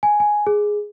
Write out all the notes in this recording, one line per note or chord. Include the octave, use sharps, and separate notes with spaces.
G#5
G#5
G#4